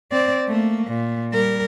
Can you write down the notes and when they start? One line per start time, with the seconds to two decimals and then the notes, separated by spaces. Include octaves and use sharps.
0.11 C4 D5
0.48 A3 A#3
0.88 A#2
1.33 G3 A#4